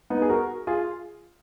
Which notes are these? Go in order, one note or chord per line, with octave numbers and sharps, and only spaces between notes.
B3 D#4
G#4
F#4 A#4
F4 G#4